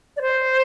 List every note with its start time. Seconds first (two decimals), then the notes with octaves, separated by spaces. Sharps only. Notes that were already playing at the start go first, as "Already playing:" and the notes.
0.17 D5
0.21 C5